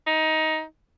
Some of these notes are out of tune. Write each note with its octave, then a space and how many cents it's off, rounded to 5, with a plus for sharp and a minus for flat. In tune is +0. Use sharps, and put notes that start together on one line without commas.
D#4 +15